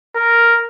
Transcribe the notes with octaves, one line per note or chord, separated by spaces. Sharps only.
A#4